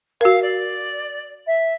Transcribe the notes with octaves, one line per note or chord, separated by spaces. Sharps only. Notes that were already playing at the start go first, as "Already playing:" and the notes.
F#4 A#4 F5
D5
E5